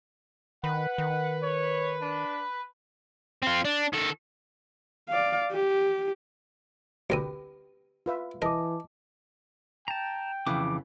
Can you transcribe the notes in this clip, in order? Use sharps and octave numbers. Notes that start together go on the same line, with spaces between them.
D#3 B4 F#5
D#3
C#5
D4
C4 F4
D4
D#3 A4
D5 F5
G4
D2 G4 A#4 B4 D#6
F4 B4 E5
E3 A#4 D#5 A5 D6
G5 A5 A#5
F2 C#3 E3 D6